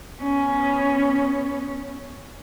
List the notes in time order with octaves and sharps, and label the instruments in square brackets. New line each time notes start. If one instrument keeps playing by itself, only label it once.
[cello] B3 C#4